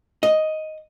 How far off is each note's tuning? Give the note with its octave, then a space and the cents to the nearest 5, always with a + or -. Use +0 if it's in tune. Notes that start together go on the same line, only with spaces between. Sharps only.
D#5 +5